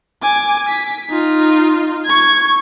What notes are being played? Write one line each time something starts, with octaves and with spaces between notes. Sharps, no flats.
G#5 D6
B6
D#4 F4
C#6 G#6